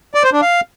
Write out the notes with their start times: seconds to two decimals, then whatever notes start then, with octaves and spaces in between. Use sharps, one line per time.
0.14 D5
0.24 C5
0.33 D4
0.42 F5